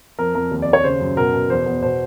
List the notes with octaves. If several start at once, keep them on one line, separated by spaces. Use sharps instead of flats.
F2 A#4
F2 A#4
D#2
D5
D#2
C#5
C#3 C5
F#2
B2 A#4
B2
E2 C5
E2
B2 C5